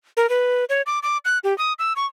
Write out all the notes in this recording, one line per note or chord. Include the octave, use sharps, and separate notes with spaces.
A#4
B4
C#5
D6
D6
F#6
G4
D#6
E6
C#6